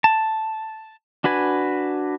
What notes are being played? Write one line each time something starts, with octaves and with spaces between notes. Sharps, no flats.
A5
D4 F#4 B4 G#5